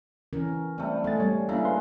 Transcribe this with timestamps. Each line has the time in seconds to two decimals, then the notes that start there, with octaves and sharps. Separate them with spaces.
0.33 E3 C#4 A#4
0.78 G3 A3 C4
1.04 G#3 A3 B3 A6
1.20 G3 C#5
1.49 C#3 A#3 D4 E4 A#5
1.65 B4 C6